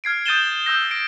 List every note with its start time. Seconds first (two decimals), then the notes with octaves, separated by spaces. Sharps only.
0.04 F6 G#6 C7 D7
0.26 D#6 G6 A6 D#7 E7 G7
0.66 D#6 E6 G6 A#6
0.91 A#6 D7